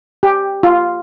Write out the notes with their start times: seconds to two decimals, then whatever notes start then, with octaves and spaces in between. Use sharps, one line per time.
0.23 G4
0.63 F4